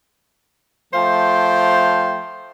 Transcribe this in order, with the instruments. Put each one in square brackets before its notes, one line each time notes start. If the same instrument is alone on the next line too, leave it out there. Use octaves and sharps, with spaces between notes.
[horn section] F3 A3 C5 F5 G5